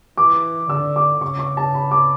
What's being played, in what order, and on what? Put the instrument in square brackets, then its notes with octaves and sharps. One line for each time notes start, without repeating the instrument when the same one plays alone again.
[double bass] E3 [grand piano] D6
[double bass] D3 [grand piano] E6
[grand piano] D6
[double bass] C#3 [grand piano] C#6
[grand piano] C#6
A5
B5
D6